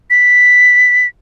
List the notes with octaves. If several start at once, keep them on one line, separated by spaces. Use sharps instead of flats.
B6